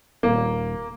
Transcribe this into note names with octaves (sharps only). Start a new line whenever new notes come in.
D#1 A#3